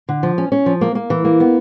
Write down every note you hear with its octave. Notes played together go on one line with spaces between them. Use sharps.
D3
F3
C#4
C#4
F3
A#3
A#3
E3
A#3
B3